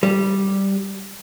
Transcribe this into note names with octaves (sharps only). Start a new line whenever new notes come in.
G3